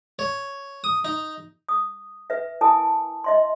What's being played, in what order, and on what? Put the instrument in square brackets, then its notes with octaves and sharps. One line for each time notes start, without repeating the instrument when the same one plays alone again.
[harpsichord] C#5
D#6
D#4
[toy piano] D#6
B4 E5
E4 A#4 G#5 A5 D#6
D#5 E5 C6